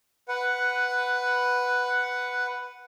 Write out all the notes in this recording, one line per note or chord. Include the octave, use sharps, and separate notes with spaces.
B4 F#5